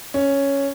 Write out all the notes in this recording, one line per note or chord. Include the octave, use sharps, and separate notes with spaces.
C#4